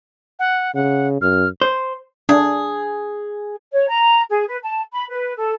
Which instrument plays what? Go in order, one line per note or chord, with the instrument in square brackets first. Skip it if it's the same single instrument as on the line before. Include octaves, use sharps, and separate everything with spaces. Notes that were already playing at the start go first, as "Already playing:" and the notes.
[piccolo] F#5
[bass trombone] C#3 [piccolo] F#5
[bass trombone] F#2 [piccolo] F6
[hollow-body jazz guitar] C5
[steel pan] D4 [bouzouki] G#4
[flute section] C#5
A#5
G#4
B4
A5
B5
B4
A4